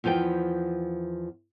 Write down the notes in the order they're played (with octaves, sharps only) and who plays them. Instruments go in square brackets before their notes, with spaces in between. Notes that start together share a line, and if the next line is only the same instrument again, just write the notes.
[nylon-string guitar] E2 F3 F4 B4 G5